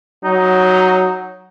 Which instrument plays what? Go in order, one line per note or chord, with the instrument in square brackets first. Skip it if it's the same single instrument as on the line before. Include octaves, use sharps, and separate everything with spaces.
[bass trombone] F#3 [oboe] D#4